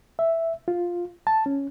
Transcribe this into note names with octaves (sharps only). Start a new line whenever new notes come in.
E5
F4
A5
C#4